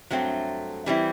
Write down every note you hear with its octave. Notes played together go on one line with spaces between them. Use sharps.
G2 F#3 A3 C4
E3 G3 C4 E4